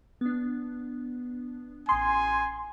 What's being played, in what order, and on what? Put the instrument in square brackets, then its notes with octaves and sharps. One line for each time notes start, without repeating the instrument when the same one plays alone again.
[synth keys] B3 D4
[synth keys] A1 D#6 [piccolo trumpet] G#5 [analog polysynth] C6